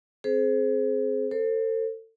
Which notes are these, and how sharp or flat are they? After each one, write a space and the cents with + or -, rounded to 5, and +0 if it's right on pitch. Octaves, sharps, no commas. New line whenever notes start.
C4 +0 G#4 +35 C5 +0
A4 +30 C5 +15